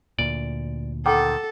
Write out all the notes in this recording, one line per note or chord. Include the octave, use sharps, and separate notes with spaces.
D2 A#2 D5
D#3 A4 F#5 G5 D6